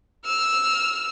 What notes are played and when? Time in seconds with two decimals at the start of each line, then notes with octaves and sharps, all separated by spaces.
0.25 E6 F6